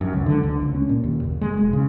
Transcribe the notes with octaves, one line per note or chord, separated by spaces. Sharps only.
F#2
C#2
D3
D2
C#2
C#4
A#2
D#2
F#1
G#3
E1
C#3